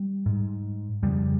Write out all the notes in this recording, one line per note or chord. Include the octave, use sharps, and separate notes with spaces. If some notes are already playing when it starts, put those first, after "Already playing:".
Already playing: G3
G#2
F2 C#3 G3